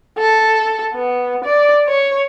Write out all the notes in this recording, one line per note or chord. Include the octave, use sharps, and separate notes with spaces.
A4
B3
D5
C#5